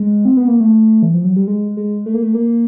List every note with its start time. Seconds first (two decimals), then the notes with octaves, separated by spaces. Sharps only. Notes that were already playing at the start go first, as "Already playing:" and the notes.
Already playing: G#3
0.25 C4
0.37 B3
0.48 A#3
0.60 A3
1.02 E3
1.14 F3
1.25 F#3
1.36 G3
1.48 G#3
1.77 G#3
2.06 A3
2.14 A#3
2.23 A3
2.34 A#3